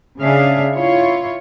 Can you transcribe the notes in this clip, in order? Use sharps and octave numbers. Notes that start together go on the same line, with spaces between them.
C#3 C#4 D4 G#4 E5 F5
E4 F4 C#5 F5